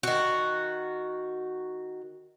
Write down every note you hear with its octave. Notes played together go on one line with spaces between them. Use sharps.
D#3 F#4